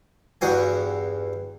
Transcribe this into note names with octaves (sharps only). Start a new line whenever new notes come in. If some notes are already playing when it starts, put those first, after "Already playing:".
E2 G2 F#4 F5 G#5